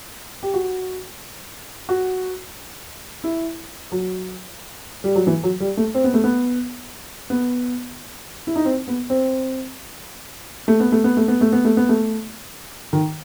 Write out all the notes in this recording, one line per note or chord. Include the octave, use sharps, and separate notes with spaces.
G4
F#4
F#4
E4
F#3
G3
F#3
E3
F#3
G3
A3
C4
B3
A3
B3
B3
E4
D#4
C4
B3
C4
A3
B3
A3
B3
A3
B3
A3
B3
A3
B3
A3
D#3